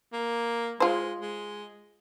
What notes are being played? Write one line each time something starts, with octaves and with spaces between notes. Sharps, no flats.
A#3
G#3 F4 C5
G#3